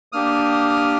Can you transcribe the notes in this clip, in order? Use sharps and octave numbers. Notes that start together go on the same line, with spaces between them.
A#3 D4 G4 D#6 F6